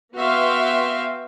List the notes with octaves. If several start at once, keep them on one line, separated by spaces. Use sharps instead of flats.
B3 F#4 E5 F5 G5 C6